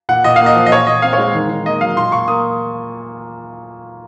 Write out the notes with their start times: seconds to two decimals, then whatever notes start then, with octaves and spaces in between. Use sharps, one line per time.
0.09 A#2 F#5
0.24 A#2 D#5
0.36 A#3 F5
0.46 D#5
0.55 F3
0.66 D#5
0.72 A#2 C#5
0.87 A#2 D#5
1.02 C4 F5
1.13 C#5
1.18 G#3
1.34 D#3
1.50 D#3
1.65 A#3 D#5
1.81 F#3 F5
1.96 A#2 C6
2.12 A#2 C#6
2.28 A#3 D#6